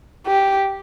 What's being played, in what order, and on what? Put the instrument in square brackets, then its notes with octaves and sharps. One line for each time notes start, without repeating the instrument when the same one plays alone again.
[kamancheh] G4